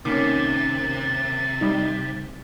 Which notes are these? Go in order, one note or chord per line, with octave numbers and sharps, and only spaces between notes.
C3 D#3 A#3 C#4 D6 A6
G3 D#4